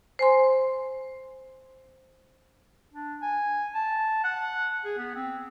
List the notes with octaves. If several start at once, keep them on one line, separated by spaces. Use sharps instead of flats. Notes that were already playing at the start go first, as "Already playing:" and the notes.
C5 G#5 C6
D4
G#5
A5
F#5
G#4
B3
C4